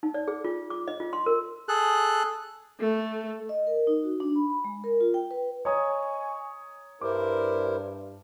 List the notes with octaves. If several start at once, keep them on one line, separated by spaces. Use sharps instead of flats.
D#4
D5
G#4
F4
D6
D#5
F4
C6
A#4
G#4 A4 F#6
A3
D#5
A#4
D#4
F#4
D4
B5
B5
G#3
A#4
F4
G5
B4
C#5 D#5 G#5 A#5 C#6 D#6
G2 E4 A#4 C5 D6